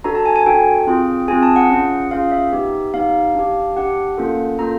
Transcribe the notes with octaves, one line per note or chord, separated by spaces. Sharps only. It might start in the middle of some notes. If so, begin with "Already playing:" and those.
D4 F#4 A4 A#5
A5
G#5
G#5
D4 F#4 A4 G5
C4 F4 G#4
C4 F4 G#4 G#5
A5
F#5
C#4 F4 G#4
C#4 F4 G#4 F5
E5
B3 D#4 G4
B3 D#4 G4 F5
D4 G4
D4 G4 F#5
A#3 C#4 F4 A4
A#3 C#4 F4 A4 A#5